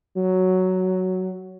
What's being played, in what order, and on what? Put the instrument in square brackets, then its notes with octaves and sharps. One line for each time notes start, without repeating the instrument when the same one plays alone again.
[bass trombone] F#3